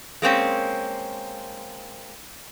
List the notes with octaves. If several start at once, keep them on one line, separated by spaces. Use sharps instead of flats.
G#3 A#3 C4 C#4